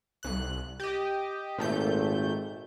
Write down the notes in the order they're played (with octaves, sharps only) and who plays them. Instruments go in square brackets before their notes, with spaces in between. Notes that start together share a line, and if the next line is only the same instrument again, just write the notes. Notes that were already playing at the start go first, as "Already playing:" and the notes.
[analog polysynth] C2 F#6
G4 D#5
[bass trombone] G#1 [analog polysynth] A#2 A3 G6